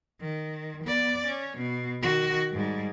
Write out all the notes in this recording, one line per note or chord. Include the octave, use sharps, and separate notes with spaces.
D#3
B3 D5
C#4
B2
D#3 F#4
G#2 G3